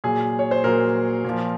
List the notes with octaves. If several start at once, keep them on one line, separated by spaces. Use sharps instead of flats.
A#2 F#3 G#4
C#5
C5
A#2 F#3 A#4
A#2 F3